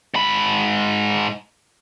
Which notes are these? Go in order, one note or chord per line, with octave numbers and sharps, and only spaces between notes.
G#2 B5